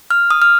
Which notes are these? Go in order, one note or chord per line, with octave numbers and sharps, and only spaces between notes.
F6
D#6
F6